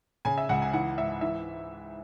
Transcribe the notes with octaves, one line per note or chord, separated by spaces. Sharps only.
C#3 G#5
E5
C#2 F#5
G#5
E3 F#5
G#2 E5
E3 E5